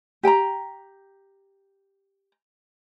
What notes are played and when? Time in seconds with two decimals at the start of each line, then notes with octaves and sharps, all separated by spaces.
0.23 G4 G5 A5 A#5